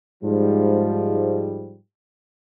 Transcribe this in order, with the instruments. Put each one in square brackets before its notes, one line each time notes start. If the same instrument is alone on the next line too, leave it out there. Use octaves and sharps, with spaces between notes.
[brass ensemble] G#2 F3 G3